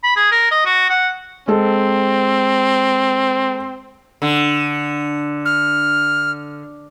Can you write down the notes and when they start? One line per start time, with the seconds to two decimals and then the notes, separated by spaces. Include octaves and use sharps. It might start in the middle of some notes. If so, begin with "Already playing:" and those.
0.03 B5
0.16 G#4
0.31 A#4
0.51 D#5
0.65 F#4
0.90 F#5
1.48 G#3 C4 A4
4.22 D3
5.45 F6